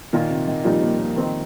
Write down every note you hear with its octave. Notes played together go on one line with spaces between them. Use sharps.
A#2 D#3 A#3 F4
C3
D#3
A#2 F3 G3 D#4
A#3
A#3
D#3 C4 D#4